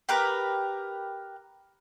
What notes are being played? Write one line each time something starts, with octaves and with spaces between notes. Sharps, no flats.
G4 A#4 B4 A#5